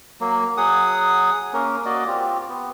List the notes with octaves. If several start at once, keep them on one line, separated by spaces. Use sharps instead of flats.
F#3 A#3
F#3 G#4 F#5 D#6
A#3 C#4 A#4
A#3 F#4 D5 D#5
C4 F4 G4
B3